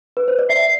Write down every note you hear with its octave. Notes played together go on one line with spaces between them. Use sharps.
B4
C5
D5
E5 C7